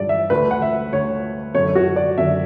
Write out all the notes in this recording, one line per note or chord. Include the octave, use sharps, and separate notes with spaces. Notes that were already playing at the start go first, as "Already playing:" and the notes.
Already playing: G2 E3 D5
E5
D2 D3 B4
F#5
E5
D2 D3 C#5
F#2 D3 C#5
F#4
D5
F#2 D3 E5